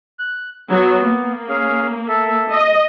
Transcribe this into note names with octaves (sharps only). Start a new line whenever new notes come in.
F#6
F#3 B3
A#3
C#4 G#4 F5
A4 E5
D#5